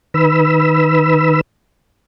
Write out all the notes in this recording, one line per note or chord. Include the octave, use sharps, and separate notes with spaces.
D#3 B4 B5 E6